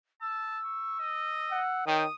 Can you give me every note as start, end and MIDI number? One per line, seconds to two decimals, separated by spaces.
0.21 0.58 81
0.21 1.84 88
0.64 0.99 85
0.99 1.61 75
1.51 1.87 78
1.87 2.06 51
1.87 2.05 73
1.87 2.04 79
1.87 2.15 87